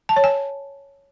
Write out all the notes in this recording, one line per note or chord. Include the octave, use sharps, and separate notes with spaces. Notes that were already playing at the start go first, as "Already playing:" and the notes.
A5
C#5
G#5